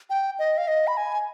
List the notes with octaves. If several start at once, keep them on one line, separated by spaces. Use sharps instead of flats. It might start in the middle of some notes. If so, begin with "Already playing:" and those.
G5
D#5
F5
D#5
B5
G#5